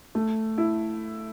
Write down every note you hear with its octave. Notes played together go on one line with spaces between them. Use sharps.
A3
E4